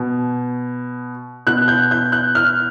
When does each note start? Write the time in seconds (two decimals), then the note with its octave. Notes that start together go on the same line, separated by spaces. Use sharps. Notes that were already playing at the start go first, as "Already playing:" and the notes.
Already playing: B2
1.47 B2 F#6
1.68 G6
1.91 G6
2.12 F#6
2.35 F6